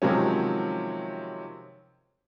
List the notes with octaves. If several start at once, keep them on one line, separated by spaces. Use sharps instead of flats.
C3 D#3 F3 F#3 G#3 C#4